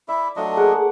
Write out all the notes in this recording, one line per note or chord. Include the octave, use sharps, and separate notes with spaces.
E4 D5 E5
F3 F#3 A3 D4 F4 D#5
A#3 G#4 A#4 F#5